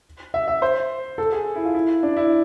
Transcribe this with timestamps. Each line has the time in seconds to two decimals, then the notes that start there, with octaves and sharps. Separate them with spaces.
0.34 E5
0.48 E5
0.62 C5
1.18 A4
1.32 G#4
1.56 E4
1.65 F4
1.74 E4
2.03 D4
2.16 E4